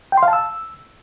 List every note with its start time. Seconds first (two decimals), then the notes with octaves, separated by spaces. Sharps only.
0.12 G5
0.17 C6
0.23 F5
0.28 A5
0.33 E6